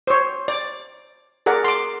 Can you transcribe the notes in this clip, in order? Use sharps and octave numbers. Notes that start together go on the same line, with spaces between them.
C5 C#5
D5
G#4 A#4 D5 F#5
C6 D6